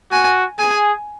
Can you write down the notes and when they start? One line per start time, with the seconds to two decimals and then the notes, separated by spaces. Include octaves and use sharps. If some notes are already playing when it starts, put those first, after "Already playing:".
0.12 F#4 G#5
0.59 G#4 G#5